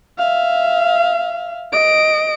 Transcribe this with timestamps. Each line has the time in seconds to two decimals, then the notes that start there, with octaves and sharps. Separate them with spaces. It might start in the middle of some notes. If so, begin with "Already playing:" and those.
0.18 E5 F5
1.73 D#5 D7